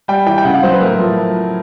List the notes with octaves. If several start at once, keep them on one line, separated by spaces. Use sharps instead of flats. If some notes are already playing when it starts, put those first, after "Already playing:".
G3 G5
E3 G5
G5
C#3 F#5
F5
F#3 C5
B4
A2 A#4
F3